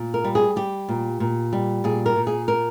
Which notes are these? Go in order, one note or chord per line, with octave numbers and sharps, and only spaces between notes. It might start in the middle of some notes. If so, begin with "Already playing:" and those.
Already playing: A#2
A#4
G3
G#4
G3 G4
A#2
A#2
G3
A#2 G#4
A#4
A#2
G#4
A#4